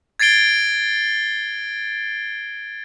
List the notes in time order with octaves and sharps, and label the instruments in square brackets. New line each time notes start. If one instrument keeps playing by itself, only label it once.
[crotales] G#6 A6 C7 D7 G7